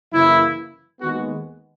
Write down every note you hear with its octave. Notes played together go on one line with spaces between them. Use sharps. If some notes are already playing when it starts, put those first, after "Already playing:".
F#2 C#3 E3 A#3 E4
D#2 D#3 G#3 B3 F#4